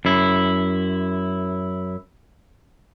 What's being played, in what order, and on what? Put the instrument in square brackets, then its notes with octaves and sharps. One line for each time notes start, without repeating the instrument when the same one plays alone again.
[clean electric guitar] F#2 E4